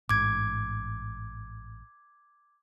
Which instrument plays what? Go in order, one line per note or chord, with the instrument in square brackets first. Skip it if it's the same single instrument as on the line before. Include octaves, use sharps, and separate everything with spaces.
[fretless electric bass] A1 G#2 [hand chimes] D6 G#6